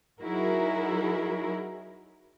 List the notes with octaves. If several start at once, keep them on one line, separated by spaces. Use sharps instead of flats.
F#3 D#4 E4 F#4 G#4 A#4